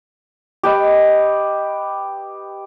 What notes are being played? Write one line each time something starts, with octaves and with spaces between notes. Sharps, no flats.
G4 B4 D#5